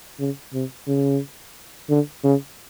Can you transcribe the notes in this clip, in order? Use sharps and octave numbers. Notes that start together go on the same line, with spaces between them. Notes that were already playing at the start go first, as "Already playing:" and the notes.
C#3
C3
C#3
D3
C#3